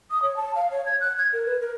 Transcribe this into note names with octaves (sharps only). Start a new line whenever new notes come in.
D#6
C#5
A5
F5
C#5
G#6
F#6
G#6
A#4
B4
A#4